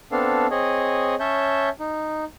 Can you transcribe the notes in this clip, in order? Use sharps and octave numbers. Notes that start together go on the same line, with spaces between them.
B3 C4 D4 A4 F5
C4 G#4 C#5 D#5
C#4 C#5 E5 A5 G6
D#4